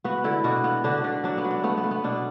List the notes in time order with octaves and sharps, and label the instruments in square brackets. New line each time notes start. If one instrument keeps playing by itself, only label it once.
[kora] B3 F#4 B4
D3 E4 A4
B2 D4 F#4
B3
D3 D4 F#4
D3 D4
F#3 D4
B3
F#3
D4
A3 B3
B3
A3
B3
B2 D4